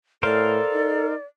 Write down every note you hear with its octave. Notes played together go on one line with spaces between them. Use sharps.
A2 A4 A#4 C5 D5 F5
D#4